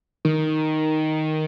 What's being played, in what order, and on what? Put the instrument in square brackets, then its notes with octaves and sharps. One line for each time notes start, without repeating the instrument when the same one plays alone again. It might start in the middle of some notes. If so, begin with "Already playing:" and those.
[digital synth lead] D#3